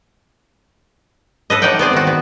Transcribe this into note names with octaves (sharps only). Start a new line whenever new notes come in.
A4 B4 D#5
G3 A3 D#4 D5 F#5 G5
B3 C4 G#4 D5
D#3 F#4
B3